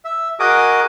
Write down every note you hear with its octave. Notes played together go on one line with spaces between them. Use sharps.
E5
F#4 G#4 A#4 D#5 D6 D#6